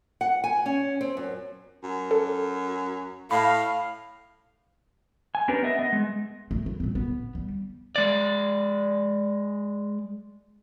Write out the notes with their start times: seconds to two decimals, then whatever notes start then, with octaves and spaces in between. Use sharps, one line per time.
0.21 F#5
0.44 G#5
0.66 C#4
1.01 C4
1.17 F#2
1.83 F#2
2.11 A4
3.31 A2 F5 B5
5.35 G#5
5.48 B3 C#4 D4 G4 A#4 B4
5.63 B3 D#5 E5
5.79 B3 D#5
5.93 G#3
6.51 A3
6.66 E4
6.80 A#2 C4
6.95 B3
7.35 G3
7.96 G#3 D5